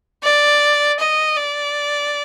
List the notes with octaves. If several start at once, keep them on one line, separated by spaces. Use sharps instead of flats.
D5
D#5
D5